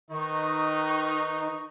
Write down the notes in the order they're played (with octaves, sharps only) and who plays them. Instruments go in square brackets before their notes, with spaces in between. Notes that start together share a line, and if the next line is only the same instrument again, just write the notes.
[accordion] D#3 [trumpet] D#4 [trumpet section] B4 D#5 [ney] C#6